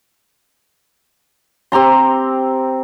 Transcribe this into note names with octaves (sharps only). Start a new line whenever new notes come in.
C4 G4 A#5 C6